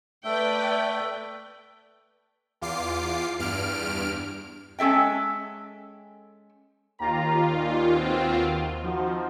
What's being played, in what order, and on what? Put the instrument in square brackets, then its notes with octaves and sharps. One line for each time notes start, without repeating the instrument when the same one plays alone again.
[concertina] A3 E5 [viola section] B4 D5 G5
[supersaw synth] E2 F4 D6 C7
E2 G2 F6 D7
[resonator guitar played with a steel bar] G#3 C#4 A4 E5 G5
[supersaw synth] D#2 F4 [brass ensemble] G4 G5 A#5
[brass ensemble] A#2 D#3
B2 A#3 C4
[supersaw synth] F3 [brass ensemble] C4 D#4 F#4